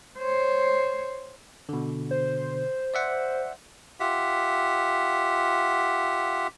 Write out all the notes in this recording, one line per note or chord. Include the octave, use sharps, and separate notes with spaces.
C5 C#5
B2 D3
C5
D5 E5 F#5
F4 G4 E5 F#5